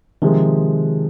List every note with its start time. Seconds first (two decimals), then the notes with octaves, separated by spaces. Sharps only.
0.22 C3 D#3 F3 G#3